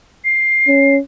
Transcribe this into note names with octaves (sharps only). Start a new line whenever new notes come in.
C7
C#4